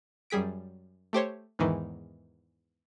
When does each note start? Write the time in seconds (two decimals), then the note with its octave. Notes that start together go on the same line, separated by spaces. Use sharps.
0.30 F#2 G3 G#4 B6 D7
1.13 A3 G4 C5 C#5
1.59 E2 G#2 D#3 E3